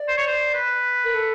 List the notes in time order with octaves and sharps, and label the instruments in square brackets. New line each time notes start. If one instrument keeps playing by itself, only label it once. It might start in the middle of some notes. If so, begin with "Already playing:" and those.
Already playing: [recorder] D5
[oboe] C5
C#5
C5
B4
[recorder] A#4
A4